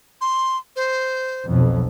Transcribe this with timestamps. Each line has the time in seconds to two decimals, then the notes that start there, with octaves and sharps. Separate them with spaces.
0.21 C6
0.76 C5
1.48 B1 F2